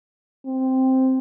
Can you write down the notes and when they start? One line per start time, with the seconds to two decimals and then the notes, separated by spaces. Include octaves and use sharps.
0.46 C4